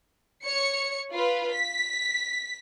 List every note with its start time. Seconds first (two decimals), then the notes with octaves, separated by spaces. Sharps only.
0.42 C#5 C#7
1.13 F4 B4
1.53 B6